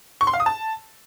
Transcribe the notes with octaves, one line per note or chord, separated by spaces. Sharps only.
C#6
C6
F5
D#6
A5